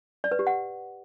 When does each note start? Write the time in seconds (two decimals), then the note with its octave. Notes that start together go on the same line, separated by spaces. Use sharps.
0.24 D5
0.32 B4
0.39 G4
0.47 F#5